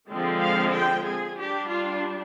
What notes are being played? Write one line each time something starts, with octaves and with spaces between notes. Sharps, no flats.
D3 F3 G#3 C4
F5
G5
G#4
G3 D4 G4
F4